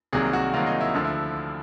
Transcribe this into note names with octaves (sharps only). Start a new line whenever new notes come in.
C2 C3 D#3 F#3 A#3 G#4
F#4
C2 C3 D#3 F#3 A#3 F4
D#4
E4
D2 D3 F3 F4
E4